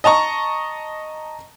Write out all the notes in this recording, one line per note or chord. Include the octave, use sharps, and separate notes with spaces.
D#5 A5 A#5 C#6